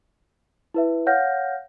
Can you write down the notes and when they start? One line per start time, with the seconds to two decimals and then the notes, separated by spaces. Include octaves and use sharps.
0.74 E4 B4 E5
1.06 C#5 F5 F#5 F6 G6 A#6